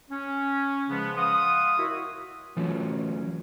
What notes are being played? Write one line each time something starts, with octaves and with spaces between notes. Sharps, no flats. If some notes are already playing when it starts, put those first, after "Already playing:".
C#4
C#3 F3 G#3 B3
F5 F#5 C6 D#6
E4 F#4 A#4 C#5 D#5 E5
E3 F#3 A3 C#4 F4 F#4